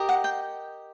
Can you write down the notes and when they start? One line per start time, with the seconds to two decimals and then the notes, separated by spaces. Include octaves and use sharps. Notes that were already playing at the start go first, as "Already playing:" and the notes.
Already playing: G4 A#4 D#5
0.09 F#5
0.24 G5